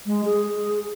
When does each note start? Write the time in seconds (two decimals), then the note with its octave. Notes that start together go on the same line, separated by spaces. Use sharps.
0.06 G#3
0.25 G#4